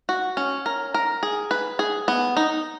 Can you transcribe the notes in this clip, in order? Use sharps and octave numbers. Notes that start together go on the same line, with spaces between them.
F#4
C#4
A#4
A#4
G#4
B4
G#4
B3
D#4